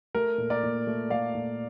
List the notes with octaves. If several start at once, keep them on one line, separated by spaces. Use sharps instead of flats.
A3 A#4
A#2
A#4 D5
A#2
A3
A3 D5 F5
A#2